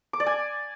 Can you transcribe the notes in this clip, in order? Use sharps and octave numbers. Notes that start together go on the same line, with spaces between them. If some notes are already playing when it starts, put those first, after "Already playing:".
D6
D5
G#5